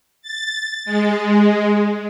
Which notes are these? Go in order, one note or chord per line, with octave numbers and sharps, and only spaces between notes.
A6
G#3